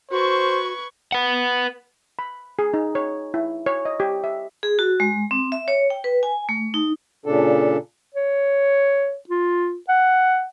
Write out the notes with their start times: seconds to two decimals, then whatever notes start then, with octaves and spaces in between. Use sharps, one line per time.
0.11 F#4 B4 C5 C#6 G#6
1.12 B4 F#5
2.19 B5
2.59 G#4
2.74 D#4
2.95 C#5
3.34 E4
3.66 C#5
3.85 D#5
4.00 G4
4.24 E5
4.63 G#4
4.79 F#4
5.00 G#3
5.31 C4
5.52 E5
5.68 C#5
5.90 G5
6.04 B4
6.23 G#5
6.49 A3
6.74 D#4
7.26 A#2 C#3 D4 A4
8.14 C#5
9.29 F4
9.89 F#5